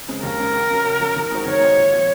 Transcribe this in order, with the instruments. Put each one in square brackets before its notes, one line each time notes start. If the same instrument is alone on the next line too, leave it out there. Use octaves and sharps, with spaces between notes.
[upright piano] C#3 G#3 C4
[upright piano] D#2 [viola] A#4
[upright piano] C#3 G#3 C4
C#2
C#3 F#3
C#2
C#3 F#3
D#3
G#3 D#4 F#4 C5
[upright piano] D#3 [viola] C#5
[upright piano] G#3 D#4 F#4 C5
A#2
F3 C4